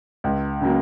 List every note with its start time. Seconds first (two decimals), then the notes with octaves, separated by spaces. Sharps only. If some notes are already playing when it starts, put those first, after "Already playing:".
0.24 C#2
0.61 C#3 F#3 A#3